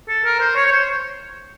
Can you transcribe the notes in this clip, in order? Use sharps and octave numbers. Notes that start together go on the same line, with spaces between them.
A4
A#4
C5
C#5
C#5
C5